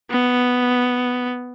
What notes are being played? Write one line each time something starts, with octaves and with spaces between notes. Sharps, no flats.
B3